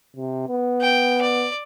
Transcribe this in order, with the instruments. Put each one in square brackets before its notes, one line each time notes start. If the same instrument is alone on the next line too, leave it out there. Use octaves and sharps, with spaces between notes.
[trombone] C3
B3
[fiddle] G5
D5